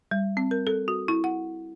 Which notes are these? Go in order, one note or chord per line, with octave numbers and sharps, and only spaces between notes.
G3
C4
A#4
A4
F#4
E4
F#5